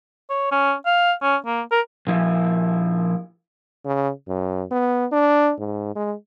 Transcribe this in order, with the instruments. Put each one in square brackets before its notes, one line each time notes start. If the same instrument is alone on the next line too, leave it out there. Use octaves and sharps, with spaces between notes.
[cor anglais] C#5
C#4
F5
C#4
A#3
A#4
[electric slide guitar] A#2 F3 E4
[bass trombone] C#3
F#2
B3
D4
G#2
G#3